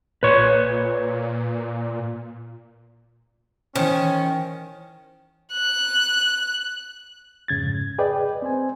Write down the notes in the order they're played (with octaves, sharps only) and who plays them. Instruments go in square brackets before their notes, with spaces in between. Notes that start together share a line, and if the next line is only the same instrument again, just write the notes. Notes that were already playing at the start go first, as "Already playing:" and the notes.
[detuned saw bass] A#2 [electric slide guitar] B4 C#5
[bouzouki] D#3 [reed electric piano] E3 C5 [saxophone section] C#4
[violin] F#6
[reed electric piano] F2 G#2 C#3 G#6 A6
G#4 B4 D5 D#5 G5
C4 C5 G#5